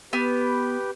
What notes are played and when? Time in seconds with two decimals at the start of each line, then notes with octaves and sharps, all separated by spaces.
0.13 B3 G4 B4 G5